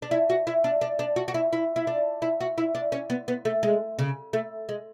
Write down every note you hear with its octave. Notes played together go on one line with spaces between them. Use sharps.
D4
E4
F#4
E4
D4
D4
D4
F#4
F#4
E4
E4
E4
D4
E4
F#4
E4
D4
C#4
B3
B3
A3
G#3
C#3
A3
G#3